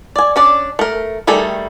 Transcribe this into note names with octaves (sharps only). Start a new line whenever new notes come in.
D5 G#5
C#4 D4 D5
A3 A#4
D#3 G3 A3 G#4 A4